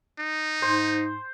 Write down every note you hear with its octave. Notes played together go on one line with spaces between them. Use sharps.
D#4
G#2 C5